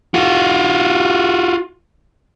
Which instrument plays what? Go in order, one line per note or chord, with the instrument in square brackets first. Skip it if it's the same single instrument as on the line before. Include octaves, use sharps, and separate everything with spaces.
[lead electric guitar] F4 F#4